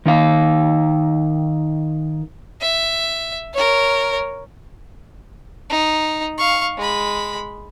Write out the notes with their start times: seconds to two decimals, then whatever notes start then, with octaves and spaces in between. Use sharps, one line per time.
0.06 D#3 D#4 F5
2.61 E5
3.54 A#4 C#5
5.70 D#4
6.38 F5 C#6
6.77 G#3 B5